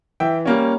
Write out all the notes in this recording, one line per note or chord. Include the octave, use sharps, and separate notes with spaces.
E3 E5 G5
G3 A#3 C#4